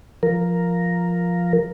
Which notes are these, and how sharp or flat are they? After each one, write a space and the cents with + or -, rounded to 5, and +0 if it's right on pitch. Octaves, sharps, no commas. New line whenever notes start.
F3 +0 A#4 +0